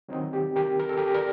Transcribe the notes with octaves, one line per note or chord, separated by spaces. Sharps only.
D#3 F#3 C4 D#4
G4
G4 A#4
A#4
A4
G4 A#4
A#4 D5